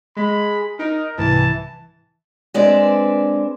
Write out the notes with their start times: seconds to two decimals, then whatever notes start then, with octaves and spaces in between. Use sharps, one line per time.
0.17 G#3 B5
0.79 D#4 A#4
1.18 C2 G#2 E3 A5
2.54 G#3 C4 D4 B4 D5